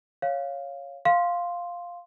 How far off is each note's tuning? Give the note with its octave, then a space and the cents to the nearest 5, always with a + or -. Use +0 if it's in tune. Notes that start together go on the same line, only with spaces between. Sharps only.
C#5 +0 F5 +0
F5 +0 C6 +0